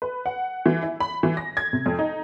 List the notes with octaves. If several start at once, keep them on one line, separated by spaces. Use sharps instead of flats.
B4
F#5
E3
E4
B5
E3
A#6
G#6
C3
F2
D#4